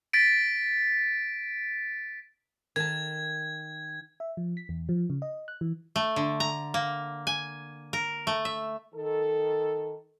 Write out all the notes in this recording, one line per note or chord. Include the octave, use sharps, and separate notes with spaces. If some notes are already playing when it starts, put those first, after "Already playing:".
A6 B6 D7
D#3 A5 G#6
E5
F3
B6
E2
F3
C#3
D#5
F#6
E3
A3
D3
A#5
A#3
G#5
A#4
A3
E5
D#3 A4